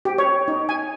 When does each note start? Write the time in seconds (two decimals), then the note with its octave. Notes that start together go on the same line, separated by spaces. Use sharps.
0.05 G4
0.18 C#5
0.48 D#4
0.69 G#5